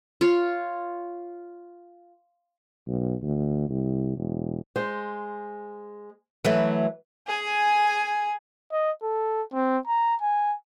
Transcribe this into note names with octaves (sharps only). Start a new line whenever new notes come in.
F4 C#5
B1
D2
C2
E1
G#3 C5
E3 F#3 A3 B4 E5
G#4 G#5
D#5
A4
C4
A#5
G#5